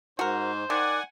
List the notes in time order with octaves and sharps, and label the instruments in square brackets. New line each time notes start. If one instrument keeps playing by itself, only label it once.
[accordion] G#2 [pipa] F#4 A#4 [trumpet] C5
[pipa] D#3 [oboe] D5 [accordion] F#5 G#5